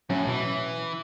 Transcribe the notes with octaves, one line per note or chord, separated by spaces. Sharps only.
A2 F#3 C#4
B2 E3